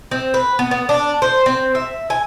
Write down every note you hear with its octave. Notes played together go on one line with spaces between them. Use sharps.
C4
B4
B3
B3
D4
C5
C4
E5
G#5